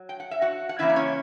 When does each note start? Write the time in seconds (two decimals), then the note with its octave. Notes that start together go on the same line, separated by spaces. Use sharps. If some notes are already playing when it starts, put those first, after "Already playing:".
Already playing: F#3
0.09 G5
0.20 F#5
0.31 E5
0.41 F#4 F#5
0.69 F#5
0.79 C#3 E3 A#3 C#4 E4 E5
0.89 D5
0.96 C#4 C#5